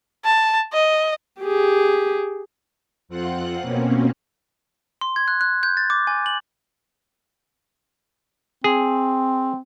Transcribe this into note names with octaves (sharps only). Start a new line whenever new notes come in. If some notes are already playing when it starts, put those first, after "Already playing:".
A5
D#5
G4 G#4
F2 C4 F4 F#5 F#6
B2 A#3 C4 C#4
C6
G#6
F#6
F#6
G6
A6
D6
G#5
F#7
C4 G#4